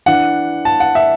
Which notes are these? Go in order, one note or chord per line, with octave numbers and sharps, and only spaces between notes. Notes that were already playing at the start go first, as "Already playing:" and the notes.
E3 D4 F#5
A5
F#5
E5